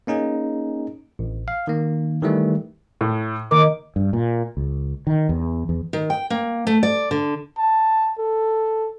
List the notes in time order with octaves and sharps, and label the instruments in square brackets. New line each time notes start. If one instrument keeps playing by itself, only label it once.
[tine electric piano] A#3 C#4 D#4 G#4
A1
F5
D#3 A#3
D#3 E3 G3 A3
[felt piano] A2
[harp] D#3 [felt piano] A#3 [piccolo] D6
[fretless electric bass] G2
A#2
C#2
D#3
E2
E2
[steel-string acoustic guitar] D#3
G5
A#3
A3
D5
D3
[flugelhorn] A5
A4